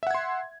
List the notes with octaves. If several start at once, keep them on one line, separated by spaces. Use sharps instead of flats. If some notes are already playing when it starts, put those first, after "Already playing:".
E5 F#5 C6 G#6